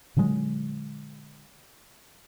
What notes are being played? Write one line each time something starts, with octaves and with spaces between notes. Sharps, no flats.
A#2 D3 F#3 G#3